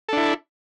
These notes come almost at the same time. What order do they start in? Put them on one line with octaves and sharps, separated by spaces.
A4 D4 E4